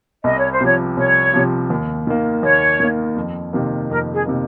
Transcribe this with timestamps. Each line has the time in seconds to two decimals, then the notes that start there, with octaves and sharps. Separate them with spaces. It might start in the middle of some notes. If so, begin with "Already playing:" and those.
0.24 C2 D#5
0.38 C#5
0.52 C5
0.61 C3 F3 C#5
0.97 C2 C#5
1.34 C3 F3
1.70 D#2
2.07 D#3 A#3
2.43 D#2 C#5
2.80 D#3 A#3
3.17 F2
3.53 C3 D#3 A#3
3.90 F2 A#4
4.14 G#4
4.26 C3 D#3 A#3